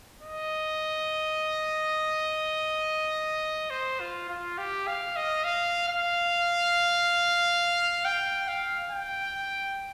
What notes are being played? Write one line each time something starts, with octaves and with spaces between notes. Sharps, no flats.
D#5
C5
F4
F4
G4
F5
D#5
F5
F5
G5
F5
G5